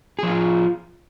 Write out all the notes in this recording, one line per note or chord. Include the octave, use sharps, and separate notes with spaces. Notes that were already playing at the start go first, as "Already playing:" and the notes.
F3 F4 G#4